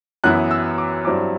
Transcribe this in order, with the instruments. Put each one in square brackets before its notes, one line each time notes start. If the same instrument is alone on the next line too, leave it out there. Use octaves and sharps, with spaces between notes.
[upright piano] F#2 E3 B3 E4 F#6
E6
D6
G2 F#3 C4 E4 D6